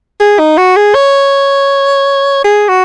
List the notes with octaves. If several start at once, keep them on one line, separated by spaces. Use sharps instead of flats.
G#4
D#4
F#4
G#4
C#5
G#4
F#4